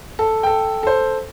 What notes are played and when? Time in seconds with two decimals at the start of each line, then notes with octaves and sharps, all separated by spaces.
0.19 A4
0.43 A4 G5
0.83 A4 C5